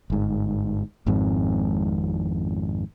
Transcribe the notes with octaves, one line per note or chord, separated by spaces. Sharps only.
G1 G#2
G#1 F2 G#2 C4